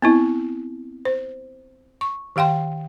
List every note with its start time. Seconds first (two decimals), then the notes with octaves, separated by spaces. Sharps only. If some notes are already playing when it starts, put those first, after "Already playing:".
0.02 B3 C4 E4
1.05 C5
2.01 C#6
2.36 D#3 G4 F5 G5 C6